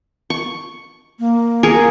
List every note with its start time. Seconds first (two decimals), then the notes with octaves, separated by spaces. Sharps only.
0.30 C#6
1.20 A#3
1.63 G#4 A#4 C#6